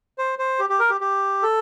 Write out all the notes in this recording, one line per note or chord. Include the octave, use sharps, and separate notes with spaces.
C5
C5
G4
G4
A#4
G4
G4
A4